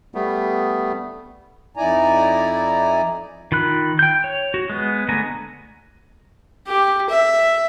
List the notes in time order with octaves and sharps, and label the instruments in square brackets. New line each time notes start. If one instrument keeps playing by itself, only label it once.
[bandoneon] G3 A3 B3
[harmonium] F2 D#4 E4 D5 G#5 A#5
[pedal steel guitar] D#3 F4 B5 F#6
G5 G6
C#5
F#4
G#3 B3
D3 A3 B3 G#5 A#5
[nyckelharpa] G4
E5